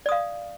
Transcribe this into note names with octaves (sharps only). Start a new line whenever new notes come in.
D5 F5 D#6